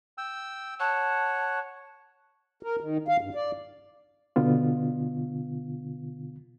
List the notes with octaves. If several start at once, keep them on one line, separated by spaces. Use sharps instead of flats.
G5 E6
C#5 F#5 A5
A#4
D#3
F5
G2
D5
B2 D3 B3 F4